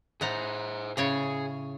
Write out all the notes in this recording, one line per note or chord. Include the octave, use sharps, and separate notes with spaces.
A2 G#4 C5 F#5 A#5
A2 C#3 G#4 C#5